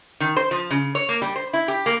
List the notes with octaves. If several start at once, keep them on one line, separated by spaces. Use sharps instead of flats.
D#3
C5
F3
C#3
C#5
A#3
G3
C5
E4
G4
A#3